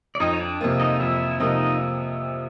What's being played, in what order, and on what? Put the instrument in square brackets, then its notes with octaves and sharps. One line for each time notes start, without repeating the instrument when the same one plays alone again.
[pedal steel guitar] D5
[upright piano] F2 [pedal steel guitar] D#4 D#5
[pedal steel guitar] C#5
D4 D5
[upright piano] C3 F3 A#3
[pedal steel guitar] D#4 D#5
[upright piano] F2 [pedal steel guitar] E4 E5
[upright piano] C3 F3 A#3 [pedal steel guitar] D#4 D#5